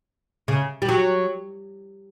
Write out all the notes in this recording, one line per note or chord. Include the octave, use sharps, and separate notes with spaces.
C#3
G3
F#3